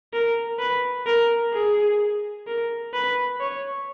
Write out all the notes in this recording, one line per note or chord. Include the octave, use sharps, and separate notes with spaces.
A#4
B4
A#4
G#4
A#4
B4
C#5